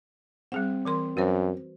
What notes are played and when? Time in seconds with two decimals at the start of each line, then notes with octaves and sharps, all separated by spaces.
0.52 G3 C4 G#4 F#5
0.85 E3 A#4 C6
1.17 F#2 F#4 B4 C5